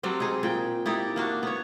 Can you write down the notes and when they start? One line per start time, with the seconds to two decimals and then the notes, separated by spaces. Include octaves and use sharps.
0.03 F#3 G3 C4 D4
0.20 D#4 G#4
0.43 A#2 G5
0.86 D#4 E4 G4 D5
1.16 A#3 D4 F#4
1.43 B3 C#5